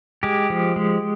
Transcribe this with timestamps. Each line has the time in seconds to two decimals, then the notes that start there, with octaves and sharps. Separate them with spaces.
0.23 G#3 G4
0.50 F3
0.76 G#3